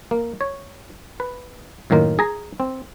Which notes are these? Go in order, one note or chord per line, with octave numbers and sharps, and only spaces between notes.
A#3
C#5
B4
F#2 A2 D#3 A#3 F4
G#4 A#5
C4